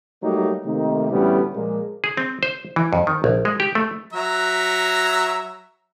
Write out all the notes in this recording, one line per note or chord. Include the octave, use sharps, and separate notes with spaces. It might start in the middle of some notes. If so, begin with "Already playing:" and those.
F#3 G3 A3 A#3 D#4 G4
C3 D#3 A3 A#3 D#4
A1 D2 G3 B3 C#4 E4
A#2 F3 G#3 A#3
G#4
C4
C5
E3
F2
D#3
A#1
G#3
G4
A3
F#3 E5 A#5